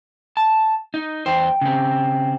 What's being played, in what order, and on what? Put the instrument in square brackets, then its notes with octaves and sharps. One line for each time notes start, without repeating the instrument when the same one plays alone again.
[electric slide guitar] A5
D#4
[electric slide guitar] E2 C5 [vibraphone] G5
[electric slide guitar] C#3 C4